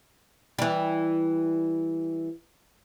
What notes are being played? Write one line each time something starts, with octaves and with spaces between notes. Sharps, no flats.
E3 G3